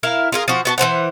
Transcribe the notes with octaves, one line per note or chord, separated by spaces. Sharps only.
E4 A#4 F5
F4 G#4 A#4
F3 F#4
B3 F#4 A5
E3 A3 C5 F#5